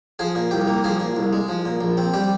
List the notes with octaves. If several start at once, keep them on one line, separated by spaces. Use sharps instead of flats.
F3 G#4
A#2
C2 G4
A#3
F3 G#4
A#2
C2
G#3
F3
A#2
A#1
C4
G3 G4